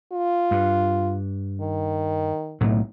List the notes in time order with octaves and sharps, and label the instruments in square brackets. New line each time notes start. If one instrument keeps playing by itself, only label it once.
[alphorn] F4
[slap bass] G2
[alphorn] D#3
[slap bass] B1 A2 A3